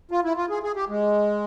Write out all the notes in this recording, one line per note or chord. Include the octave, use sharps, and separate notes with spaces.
F4
E4
F4
G#4
G#4
G4
G#3